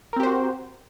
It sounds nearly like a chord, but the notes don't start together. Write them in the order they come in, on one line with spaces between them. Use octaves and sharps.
A#4 C4 G4 C5 F#4